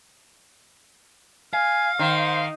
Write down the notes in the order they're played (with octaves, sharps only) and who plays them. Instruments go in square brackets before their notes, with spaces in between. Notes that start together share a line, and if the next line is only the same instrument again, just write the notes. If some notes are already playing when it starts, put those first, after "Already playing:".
[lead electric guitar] F5 [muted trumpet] G#5 [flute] F6
[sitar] D#3 [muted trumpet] C5